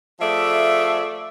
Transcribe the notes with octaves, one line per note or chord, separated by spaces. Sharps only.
F3 A3 G#4 D5 E5